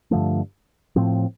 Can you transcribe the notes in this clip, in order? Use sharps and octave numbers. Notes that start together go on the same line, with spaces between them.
G2 D3 F3 A3
A2 F3 C4